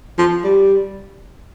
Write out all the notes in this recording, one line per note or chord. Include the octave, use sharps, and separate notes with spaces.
F3
G3